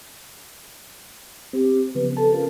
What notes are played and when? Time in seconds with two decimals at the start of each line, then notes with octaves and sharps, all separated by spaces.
1.53 C4 G4
1.95 C#3 F3 B3 B4
2.17 A4 A5
2.34 C#4 F4 A#4